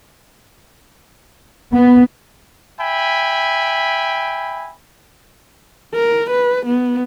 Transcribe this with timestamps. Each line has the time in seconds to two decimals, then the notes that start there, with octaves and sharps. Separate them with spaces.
1.72 B3
2.79 E5 G5 G#5 B5
5.95 A#4
6.30 B4
6.66 B3